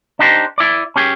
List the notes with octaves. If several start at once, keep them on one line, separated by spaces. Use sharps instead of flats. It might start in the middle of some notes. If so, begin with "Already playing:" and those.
D4 D#4 G4 C5
E4 D5
C#4 G4 G#4